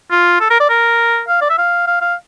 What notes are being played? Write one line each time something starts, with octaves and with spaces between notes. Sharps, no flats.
F4
A4
A#4
D5
A#4
F5
D5
E5
F5
F5
F5